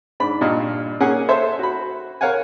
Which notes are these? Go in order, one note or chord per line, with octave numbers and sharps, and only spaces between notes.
G#2 D4 B5
G2 A#2 D#5 F5
A#3 C#4 G#4 F#5 G#5
A4 C5 C#5 E5
F#4 B5
A#4 C#5 F5 F#5 G#5